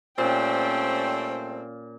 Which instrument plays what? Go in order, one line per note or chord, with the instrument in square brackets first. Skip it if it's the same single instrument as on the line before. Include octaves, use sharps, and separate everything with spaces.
[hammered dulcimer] A#2 [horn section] G3 A3 C4 [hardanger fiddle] C#4 G5